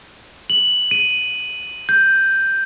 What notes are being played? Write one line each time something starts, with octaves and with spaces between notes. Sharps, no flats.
F#7
D#7
G6